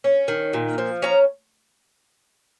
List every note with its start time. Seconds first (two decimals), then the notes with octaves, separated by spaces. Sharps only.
0.04 C#4
0.28 D#3
0.53 A#2
0.78 F3
1.02 C#4 A#5